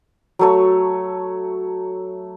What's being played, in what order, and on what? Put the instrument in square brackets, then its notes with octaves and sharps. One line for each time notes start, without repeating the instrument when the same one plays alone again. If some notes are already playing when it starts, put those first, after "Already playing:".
[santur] F#3 A3 C#5